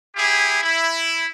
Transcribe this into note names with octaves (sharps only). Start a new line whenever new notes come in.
E4 G4 G#4
E4